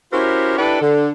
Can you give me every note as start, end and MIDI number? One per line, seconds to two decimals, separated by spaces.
0.13 0.56 61
0.13 0.56 64
0.13 0.56 66
0.13 0.56 67
0.13 0.56 70
0.13 0.56 72
0.58 0.81 62
0.58 0.81 64
0.58 0.81 67
0.58 0.81 69
0.58 0.81 71
0.58 0.81 74
0.82 1.10 50